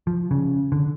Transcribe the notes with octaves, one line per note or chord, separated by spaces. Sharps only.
F3
C#3
D3